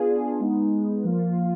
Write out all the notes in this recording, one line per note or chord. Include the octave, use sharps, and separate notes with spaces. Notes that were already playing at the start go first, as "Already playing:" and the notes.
Already playing: B3 D4 F4 G#4
G#3 B3 D#4
F3 A#3 F4